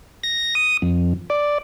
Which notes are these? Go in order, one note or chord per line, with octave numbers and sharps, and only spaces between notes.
A#6
D#6
F2
D5